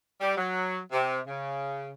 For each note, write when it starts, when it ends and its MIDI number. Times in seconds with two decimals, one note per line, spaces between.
0.21 0.34 55
0.37 0.79 54
0.92 1.18 48
1.27 1.91 49